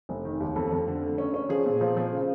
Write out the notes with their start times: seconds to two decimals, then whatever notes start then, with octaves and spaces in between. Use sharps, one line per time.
0.09 F1
0.25 D#3
0.40 D#2
0.56 F2 A4
0.72 F2
0.88 D3
1.03 A3
1.18 C#4
1.34 C#4
1.49 F3 G#4
1.66 A#2
1.81 F3
1.97 F3
2.12 C#3